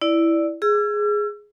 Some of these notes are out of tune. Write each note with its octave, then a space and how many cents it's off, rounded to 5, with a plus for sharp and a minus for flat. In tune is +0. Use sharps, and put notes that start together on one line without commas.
E4 +0 D5 +0
G#4 +0 E6 +40